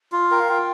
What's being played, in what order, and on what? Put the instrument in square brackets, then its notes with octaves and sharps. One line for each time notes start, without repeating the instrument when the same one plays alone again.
[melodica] F4
[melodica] A#4 [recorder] G5
[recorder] F5
[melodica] F4 [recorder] G5